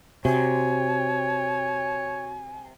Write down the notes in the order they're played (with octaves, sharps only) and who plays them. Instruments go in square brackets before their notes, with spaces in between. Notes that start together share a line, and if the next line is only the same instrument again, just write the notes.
[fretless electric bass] C3 [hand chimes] F#4 [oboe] C#5 [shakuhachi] G#5